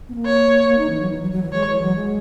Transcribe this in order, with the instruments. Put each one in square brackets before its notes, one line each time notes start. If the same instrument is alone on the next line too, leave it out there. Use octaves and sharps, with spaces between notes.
[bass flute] B3
A#3
[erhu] C#5
[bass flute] A#3
D#4
E3
F#3
E3
F#3
F#3
E3
[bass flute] G#3 [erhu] C#5
[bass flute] E3
F#3
G#3